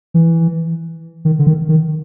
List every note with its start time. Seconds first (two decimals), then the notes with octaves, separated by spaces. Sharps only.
0.14 E3
1.25 D#3
1.39 D3
1.47 D#3
1.69 D#3